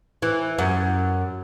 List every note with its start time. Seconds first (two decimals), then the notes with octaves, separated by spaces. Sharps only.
0.22 E3
0.59 F#2